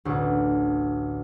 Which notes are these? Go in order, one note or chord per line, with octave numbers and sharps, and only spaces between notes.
A1 D2